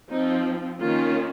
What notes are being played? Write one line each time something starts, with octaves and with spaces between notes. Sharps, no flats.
F3 C4 D#4
D#3 A#3 C#4 F4